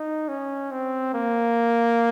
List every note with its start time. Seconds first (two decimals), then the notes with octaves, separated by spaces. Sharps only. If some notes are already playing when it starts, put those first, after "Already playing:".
Already playing: D#4
0.29 C#4
0.71 C4
1.14 A#3